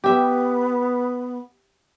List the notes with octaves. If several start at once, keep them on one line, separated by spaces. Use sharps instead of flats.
B3 G4 E5